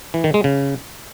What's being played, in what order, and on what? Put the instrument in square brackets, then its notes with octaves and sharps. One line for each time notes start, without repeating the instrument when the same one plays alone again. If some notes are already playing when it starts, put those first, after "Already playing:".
[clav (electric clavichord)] E3
D#3
G#3
C#3